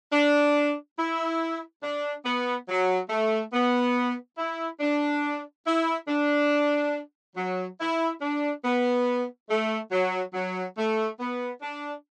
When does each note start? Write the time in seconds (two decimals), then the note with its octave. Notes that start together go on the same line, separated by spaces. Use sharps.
0.12 D4
0.98 E4
1.83 D4
2.25 B3
2.68 F#3
3.10 A3
3.53 B3
4.38 E4
4.80 D4
5.65 E4
6.08 D4
7.36 F#3
7.79 E4
8.21 D4
8.64 B3
9.49 A3
9.91 F#3
10.34 F#3
10.77 A3
11.20 B3
11.62 D4